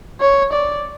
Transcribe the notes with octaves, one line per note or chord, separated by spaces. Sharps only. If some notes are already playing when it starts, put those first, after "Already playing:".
C#5
D5